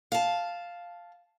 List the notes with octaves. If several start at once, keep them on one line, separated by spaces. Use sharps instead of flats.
F5 A5